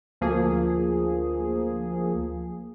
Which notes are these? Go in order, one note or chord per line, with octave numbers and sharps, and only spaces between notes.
D2 F3 A#3 G#4